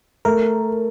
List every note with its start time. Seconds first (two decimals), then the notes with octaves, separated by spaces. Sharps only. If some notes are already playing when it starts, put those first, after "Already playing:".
0.25 A3 A#4